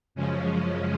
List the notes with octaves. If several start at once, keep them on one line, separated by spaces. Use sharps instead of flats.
F#2 C#3 F3 G#3 C#4